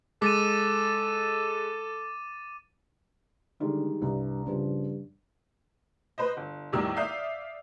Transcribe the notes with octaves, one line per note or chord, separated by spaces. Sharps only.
G#3 A4 D6 A6 D#7
D3 D#3 G3 G#3
C2 G2
G2 C#3 F3
B4 C5 D#5
G1
E2 A2 D#3 G3 E6
D5 E5 F5 D#6 G6